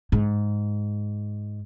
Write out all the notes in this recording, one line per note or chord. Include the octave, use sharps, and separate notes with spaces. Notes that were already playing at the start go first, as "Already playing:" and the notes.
G#2